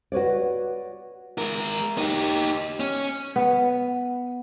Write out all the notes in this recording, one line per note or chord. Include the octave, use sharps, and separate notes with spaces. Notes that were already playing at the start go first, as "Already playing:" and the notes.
F#4 B4 C#5 D5
G#3 A#4
D#4 G4
C#4
B3